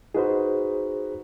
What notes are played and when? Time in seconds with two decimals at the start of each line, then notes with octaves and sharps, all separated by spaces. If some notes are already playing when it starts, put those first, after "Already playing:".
0.14 D#4 F#4 G#4 B4 C5